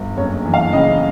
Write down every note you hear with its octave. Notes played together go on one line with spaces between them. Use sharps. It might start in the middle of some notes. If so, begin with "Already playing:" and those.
Already playing: G1
F#1 C#5
E3
F5
C#3 D#5